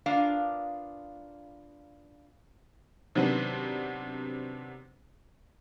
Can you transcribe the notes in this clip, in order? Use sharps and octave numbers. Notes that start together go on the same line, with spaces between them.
A#3 B3 D4 F4 F5
C3 D#3 F#3 B3 C4 D4